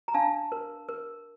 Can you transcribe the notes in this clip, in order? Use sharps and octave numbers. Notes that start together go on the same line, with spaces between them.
A#5
D4 F5 A5
A#4
A#4